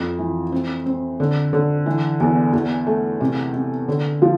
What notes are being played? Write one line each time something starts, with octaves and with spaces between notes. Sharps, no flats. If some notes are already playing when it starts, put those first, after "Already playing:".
Already playing: F2
E3
C4
C4
D3
D3
E3
E2
E2
A3
C3
C3
D3
F3